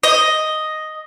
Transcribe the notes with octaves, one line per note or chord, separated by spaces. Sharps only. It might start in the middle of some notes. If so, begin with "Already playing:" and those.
D#5